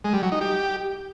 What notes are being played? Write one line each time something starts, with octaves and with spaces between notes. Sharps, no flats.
G#3
G3
F#3
D#4
G4